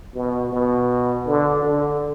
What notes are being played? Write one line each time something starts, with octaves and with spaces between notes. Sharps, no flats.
B2
B2
D3
D3